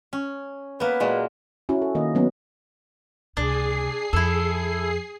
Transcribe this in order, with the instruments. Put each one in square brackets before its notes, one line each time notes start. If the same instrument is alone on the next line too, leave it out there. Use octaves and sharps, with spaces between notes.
[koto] C#4
[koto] A#3 B3 [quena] B4
[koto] A#2 F#3 G#3
[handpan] C#4 E4 F#4
A4
D#3 A#3 D#5
F#3 B3 C#4
[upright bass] C#2 C3 [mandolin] D4 [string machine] G#4 C7
[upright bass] F2 [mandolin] E4 A4